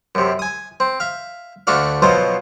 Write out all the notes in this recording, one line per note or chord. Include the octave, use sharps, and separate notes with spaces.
F#2 C3
G#5 D#6
C4
E5 F5
D2 A3 D4 F#4 D5 F5
B2 F3 F#3 C5 D#5